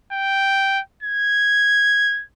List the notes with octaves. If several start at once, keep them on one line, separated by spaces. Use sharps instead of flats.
G5
G#6